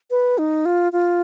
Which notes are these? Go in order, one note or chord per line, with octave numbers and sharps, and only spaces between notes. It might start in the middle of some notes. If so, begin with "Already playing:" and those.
B4
D#4
F4
F4